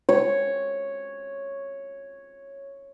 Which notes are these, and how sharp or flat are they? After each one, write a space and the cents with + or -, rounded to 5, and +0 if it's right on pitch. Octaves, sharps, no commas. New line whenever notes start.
C#5 -5